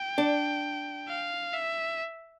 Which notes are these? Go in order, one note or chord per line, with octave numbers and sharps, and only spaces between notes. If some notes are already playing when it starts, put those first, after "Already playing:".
Already playing: G5
D4
F5
E5